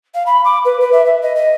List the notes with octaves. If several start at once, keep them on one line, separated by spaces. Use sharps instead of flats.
F5
B5
D6
B4
B4
E5
E5
D#5
D#5